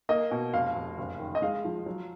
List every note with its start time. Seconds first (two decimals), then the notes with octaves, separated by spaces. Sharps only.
0.09 A#3 D#5
0.31 B2
0.54 F1 F5
0.76 F1
0.98 F#1
1.19 D#3
1.35 D#5
1.42 G#3 F5
1.65 F3
1.86 F#3